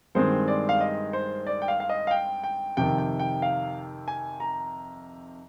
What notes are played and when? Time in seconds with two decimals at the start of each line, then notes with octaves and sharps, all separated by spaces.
0.15 G2 D#3 G#3 C4 C5
0.48 D5
0.69 F5
0.80 D#5
1.13 C5
1.46 D5
1.62 G5
1.68 F5
1.80 F5
1.89 D#5
2.07 F5
2.11 G5
2.44 G5
2.77 F2 C3 D#3 G5
2.98 G5
3.19 G5
3.42 F5
4.08 G#5
4.40 A#5